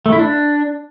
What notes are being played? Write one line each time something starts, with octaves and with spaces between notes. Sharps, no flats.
A3
E4
D4